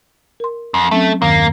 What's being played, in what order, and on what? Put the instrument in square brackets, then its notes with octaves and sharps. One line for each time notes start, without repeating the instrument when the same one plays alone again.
[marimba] A#4 C6
[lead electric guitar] F2
[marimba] F#3 C4 C#4 [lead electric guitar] A3
[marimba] E2 G2 D#3 [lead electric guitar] A#3